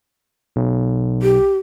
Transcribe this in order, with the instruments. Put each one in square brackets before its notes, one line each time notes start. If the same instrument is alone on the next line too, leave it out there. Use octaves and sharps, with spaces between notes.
[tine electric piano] B1
[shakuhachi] G4